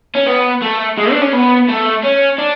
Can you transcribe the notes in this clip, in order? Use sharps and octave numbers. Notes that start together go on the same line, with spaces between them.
C#4
B3
A3
G#3
D4
C#4
B3
A3
C#4
D4